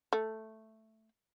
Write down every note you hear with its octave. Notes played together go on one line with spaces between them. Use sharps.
A3